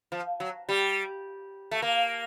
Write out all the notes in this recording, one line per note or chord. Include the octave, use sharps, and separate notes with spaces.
F3
F#3
G3
A3
A#3